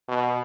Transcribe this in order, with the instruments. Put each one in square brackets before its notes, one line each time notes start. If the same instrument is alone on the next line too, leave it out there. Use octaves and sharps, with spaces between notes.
[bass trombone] B2